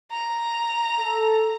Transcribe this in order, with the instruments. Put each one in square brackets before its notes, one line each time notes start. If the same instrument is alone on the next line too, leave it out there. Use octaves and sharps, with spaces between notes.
[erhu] A#5
[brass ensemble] A4